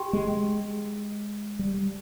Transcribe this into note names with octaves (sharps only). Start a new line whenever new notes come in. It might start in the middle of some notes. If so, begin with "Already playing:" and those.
Already playing: G4 G5 C6
G#3
G3